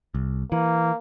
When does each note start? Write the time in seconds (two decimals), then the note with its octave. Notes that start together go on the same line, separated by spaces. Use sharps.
0.14 C2
0.52 E3 A#3